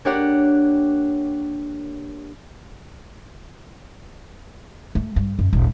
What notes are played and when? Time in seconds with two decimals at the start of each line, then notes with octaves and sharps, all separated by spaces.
0.05 A#3 D4 G4 C#5 D5 F#5
4.95 A3
5.16 G2
5.39 F#2
5.53 D#1 G#1